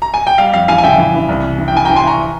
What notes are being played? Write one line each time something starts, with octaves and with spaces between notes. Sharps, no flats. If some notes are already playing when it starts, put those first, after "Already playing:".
A#5
G#5
G5
G3 F5
F2 F5
E3 F5 G#5
G#5
C#3 E5 G5
E3
E3
C2
C3
E3
G5
E3 G#5
G5 A#5
E3
G#5 C6
E3 A#5 C#6